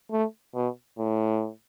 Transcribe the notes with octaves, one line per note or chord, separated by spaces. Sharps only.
A3
B2
A2